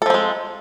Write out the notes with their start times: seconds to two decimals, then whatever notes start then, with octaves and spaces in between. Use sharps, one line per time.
0.02 A4
0.06 F3
0.10 C4
0.14 G#3